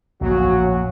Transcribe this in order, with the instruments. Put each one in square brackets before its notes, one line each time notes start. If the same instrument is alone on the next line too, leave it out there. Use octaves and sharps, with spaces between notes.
[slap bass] A#1 F#2 A2 [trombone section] F#3 F#4